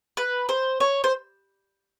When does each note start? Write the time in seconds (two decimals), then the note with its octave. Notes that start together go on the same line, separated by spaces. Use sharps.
0.17 B4
0.49 C5
0.80 C#5
1.04 C5